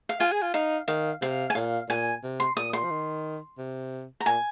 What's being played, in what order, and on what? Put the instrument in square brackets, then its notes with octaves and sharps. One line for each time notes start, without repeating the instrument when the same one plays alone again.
[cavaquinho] F5
[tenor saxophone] F4 [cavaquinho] G#5
[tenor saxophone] G#4
F4
[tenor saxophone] D#4 [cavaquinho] F5
[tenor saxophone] D#3 [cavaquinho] F5
[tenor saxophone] C3 [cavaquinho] F5
[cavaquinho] G#5
[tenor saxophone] A#2 [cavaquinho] F5
[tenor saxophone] A#2 [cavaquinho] G#5
[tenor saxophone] C3
[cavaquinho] C6
[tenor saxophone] A#2 [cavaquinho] D#6
[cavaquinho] C6
[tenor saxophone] F3
D#3
C3
[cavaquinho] A#5
[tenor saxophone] A#2 [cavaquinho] G#5